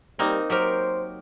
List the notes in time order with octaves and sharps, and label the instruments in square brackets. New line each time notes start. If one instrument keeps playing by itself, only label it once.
[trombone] G3 [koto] A#3 C4 D#4
[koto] F#3 G4 A#4 [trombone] C5